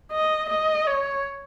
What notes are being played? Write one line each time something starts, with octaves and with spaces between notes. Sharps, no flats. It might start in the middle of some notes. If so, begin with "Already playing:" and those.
D#5
D#5
C#5